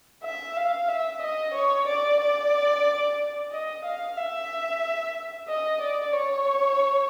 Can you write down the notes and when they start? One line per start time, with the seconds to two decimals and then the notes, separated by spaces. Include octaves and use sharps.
0.24 E5
0.56 F5
0.88 E5
1.21 D#5
1.54 C#5
1.87 D5
2.20 D5
3.51 D#5
3.84 F5
4.17 E5
5.47 D#5
5.81 D5
6.13 C#5